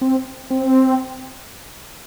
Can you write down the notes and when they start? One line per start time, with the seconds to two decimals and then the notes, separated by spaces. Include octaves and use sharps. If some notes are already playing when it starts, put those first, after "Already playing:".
0.01 C4
0.50 C4